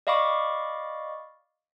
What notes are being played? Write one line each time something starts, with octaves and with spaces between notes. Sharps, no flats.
D5 D#5 F5 B5 C#6 D6